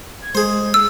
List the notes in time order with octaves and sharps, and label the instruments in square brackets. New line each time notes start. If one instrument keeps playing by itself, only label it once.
[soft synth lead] G#6
[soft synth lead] G#3 [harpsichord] G#4 C5
[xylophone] E6